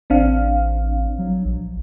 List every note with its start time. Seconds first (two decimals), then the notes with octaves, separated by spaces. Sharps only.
0.10 A1 C4 D4 F5
1.18 F#3
1.45 A#1